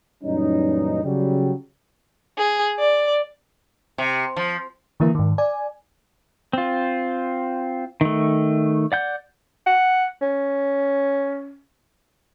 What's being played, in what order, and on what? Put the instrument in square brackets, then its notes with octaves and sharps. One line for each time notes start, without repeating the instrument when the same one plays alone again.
[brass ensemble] F#2 A#2 E3 G3 C#4 D#4
C#3 F#3 G3
[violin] G#4
D5
[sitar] C3
F3
[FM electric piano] D3 E3 A#3 E4
G#2 D#3
D5 G#5
[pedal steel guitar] C4 F4
D#3 A3
D5 F#5 G6
[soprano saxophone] F#5
C#4